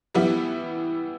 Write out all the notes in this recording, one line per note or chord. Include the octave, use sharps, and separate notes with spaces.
E3 G3 B3 E4